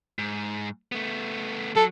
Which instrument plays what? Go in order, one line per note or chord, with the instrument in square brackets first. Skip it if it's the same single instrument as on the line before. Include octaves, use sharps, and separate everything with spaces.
[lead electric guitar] G#2
A3 B3
[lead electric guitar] F#3 [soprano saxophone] A4